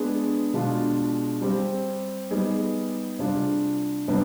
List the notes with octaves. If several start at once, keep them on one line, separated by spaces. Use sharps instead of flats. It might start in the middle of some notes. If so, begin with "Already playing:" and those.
Already playing: G#3 B3 D4 G#4
B2 G#3 D4 F4
G3 C4 G4
G3 B3 D#4 G#4
C3 G3 D4 F4 G#4
C3 G3 B3 D4